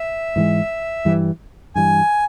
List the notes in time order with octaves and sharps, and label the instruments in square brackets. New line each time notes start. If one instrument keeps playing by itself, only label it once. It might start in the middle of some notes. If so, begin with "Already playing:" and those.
Already playing: [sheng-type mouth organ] E5
[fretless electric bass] G#2 E3 G#3
G2 E3 G3
[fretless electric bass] G2 E3 G3 [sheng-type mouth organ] G#5